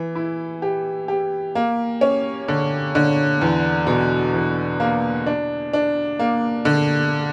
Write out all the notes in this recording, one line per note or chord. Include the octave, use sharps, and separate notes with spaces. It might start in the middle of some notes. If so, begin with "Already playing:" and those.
Already playing: E3
E4
G4
G4
A#3
C#4
D3
D3
E2
B2
E2
A#3
D4
D4
A#3
D3